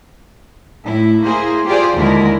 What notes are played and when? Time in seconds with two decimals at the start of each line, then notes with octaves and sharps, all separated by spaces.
0.85 A2 E4
1.25 A#3 E4 G#4 C5
1.66 F4 G4 G#4 C5 D5
1.96 D#2 D3 G#3 E4 A#4